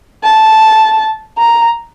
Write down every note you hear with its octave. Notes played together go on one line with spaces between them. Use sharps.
A5
A#5